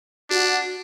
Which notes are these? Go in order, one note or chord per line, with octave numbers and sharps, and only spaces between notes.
D4 F#4